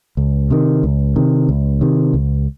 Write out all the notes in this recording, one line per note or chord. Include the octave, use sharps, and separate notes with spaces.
C#2
C3 D#3
C#2
C3 D#3
C#2
C3 D#3
C#2